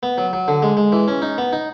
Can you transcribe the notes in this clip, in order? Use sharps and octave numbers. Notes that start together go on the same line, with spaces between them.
B3
F#3
F#3
D3
G#3
G#3
E3
C#4
D#4
B3
D#4